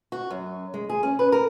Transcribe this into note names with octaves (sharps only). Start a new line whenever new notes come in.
F#4
F#2
G#3
G#4
C#4
B4
A#4